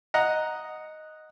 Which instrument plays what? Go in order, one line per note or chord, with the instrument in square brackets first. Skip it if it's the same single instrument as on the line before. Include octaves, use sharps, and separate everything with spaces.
[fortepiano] D#5 F#5 A#5